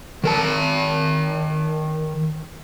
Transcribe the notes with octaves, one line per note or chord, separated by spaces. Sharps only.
D#3 A#4 A5